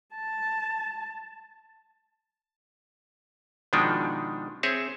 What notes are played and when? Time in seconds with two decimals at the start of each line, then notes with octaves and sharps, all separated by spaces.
0.15 A5
3.73 B2 D#3 F3 G#3 D4 D#4
4.63 C4 G#4 C#5 E5